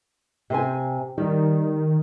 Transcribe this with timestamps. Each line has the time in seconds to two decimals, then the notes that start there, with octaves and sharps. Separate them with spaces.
0.50 C3 C5 G#5
1.18 D#3 G3